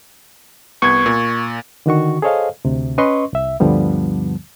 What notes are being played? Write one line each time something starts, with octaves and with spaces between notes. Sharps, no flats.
C2 B3 C#6 G#6
A#2
D3 D#3 F#4 C#6
G#4 A4 C5 C#5 D#5 F5
D2 C3
C#4 B4 D#5 C6 C#6
C2 E5
D2 G2 D3 F3 G3 B3